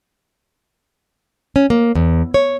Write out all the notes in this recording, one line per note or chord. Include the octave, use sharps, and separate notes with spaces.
C#4
A#3
E2
C#5